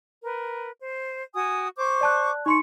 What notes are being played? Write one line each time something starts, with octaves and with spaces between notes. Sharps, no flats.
A#4 B4
C5
F#4 G#5 D#6
C5 C#6 D6
D5 A5 F#6
D#4 C6 C#6 C#7